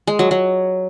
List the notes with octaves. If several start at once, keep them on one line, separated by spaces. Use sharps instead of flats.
G#3
F#3
F#3